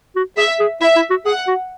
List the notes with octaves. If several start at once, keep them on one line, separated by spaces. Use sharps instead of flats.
F#4
G#4 E5
G#4
E4 E5
E4
F#4
G#4 F#5
F#4